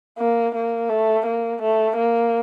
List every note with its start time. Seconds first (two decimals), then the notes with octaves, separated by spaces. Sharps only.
0.19 A#3
0.55 A#3
0.89 A3
1.26 A#3
1.61 A3
1.97 A#3